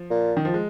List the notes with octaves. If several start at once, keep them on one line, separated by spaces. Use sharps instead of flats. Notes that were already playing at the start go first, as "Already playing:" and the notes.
Already playing: F3
A#2
D#3
F3
G#3